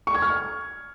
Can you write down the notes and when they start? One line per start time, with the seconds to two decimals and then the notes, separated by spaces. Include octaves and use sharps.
0.07 C#6
0.15 G#6
0.22 F6